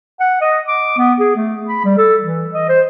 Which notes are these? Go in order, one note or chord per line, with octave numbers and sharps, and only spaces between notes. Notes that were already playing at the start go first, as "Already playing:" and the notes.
F#5
D#5
D6
B3
G#4
A3
B5
G3
A4
E3
D#5
C5